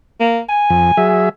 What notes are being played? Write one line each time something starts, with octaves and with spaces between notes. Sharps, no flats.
A#3
G#5
F2
F#3 G#4 E5